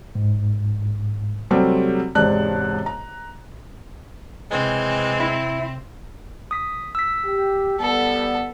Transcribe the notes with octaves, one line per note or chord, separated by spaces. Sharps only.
G#2
C3 F#3 G3 A3 C4
E1 G#2 C3 D5 A5 F#6
A#5
C3 E3 G#3 C4 C#4
E4
D#6 B6
E6 B6
G4
G3 B3 A4